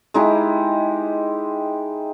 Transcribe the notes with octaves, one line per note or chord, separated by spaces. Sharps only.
G#3 D#4 E4 G4